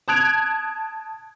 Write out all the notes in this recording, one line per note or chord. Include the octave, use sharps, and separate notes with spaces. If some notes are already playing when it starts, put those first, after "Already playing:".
A5 D#6 F#6 G#6 D7 F7